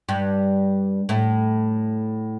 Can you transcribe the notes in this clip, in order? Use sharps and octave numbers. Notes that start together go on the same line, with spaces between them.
G2 G3
A2 A3